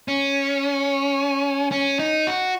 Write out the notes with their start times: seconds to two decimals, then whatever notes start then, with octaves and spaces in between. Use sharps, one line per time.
0.08 C#4
1.72 C#4
1.99 D#4
2.27 F#4